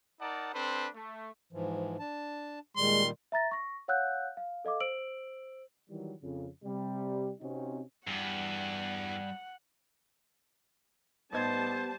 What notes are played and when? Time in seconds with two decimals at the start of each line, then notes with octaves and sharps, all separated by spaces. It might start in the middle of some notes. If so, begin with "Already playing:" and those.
0.20 D#4 A#4 D5 F#5 A5
0.54 C4 D4 A4 B4 C5
0.95 A3
1.53 G#2 E3 F3
1.99 D4 A5
2.77 A#2 D#3 G3 G#3 C6
3.32 E5 A#5 A6 A#6
3.51 C#6 A#6
3.88 C#5 F5 F#5 E6 F#6 G6
4.37 F5
4.65 A4 D#5 F5 D6
4.80 C5 E6 D7 F#7
5.89 D#3 E3 F#3 G3
6.22 F2 C#3
6.64 C3 G3
7.40 C3 C4 C#4 D#4 F#4
8.07 E2 G2 G3 F#5
11.33 A1 G3 B3 D#4 C5 A5 G#6